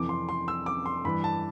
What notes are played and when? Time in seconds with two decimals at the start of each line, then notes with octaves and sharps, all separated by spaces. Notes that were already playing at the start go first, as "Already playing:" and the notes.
Already playing: F2 C3 E3 D6
0.09 C6
0.29 C6
0.48 E6
0.66 D6
0.86 C6
1.05 G2 E3 B5
1.24 A5